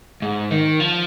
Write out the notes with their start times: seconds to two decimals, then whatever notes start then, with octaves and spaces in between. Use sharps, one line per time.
0.22 G#2
0.51 D#3
0.80 F3